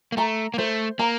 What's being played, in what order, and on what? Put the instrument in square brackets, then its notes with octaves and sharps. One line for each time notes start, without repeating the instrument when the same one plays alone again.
[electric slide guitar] A#3
[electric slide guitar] A3 [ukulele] A#5
[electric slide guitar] A#3
[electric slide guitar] A3 [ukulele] C5
[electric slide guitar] A#3 [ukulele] A#5